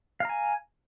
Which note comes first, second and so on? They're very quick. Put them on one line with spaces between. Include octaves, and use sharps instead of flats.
F5 A#5 G#5